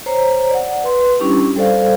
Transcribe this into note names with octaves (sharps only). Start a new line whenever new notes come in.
C5 C#5 A#5
D5 F#5
B4 C6
G3 C#4 D4 E4 G4
G3 A4 C5 D5 F5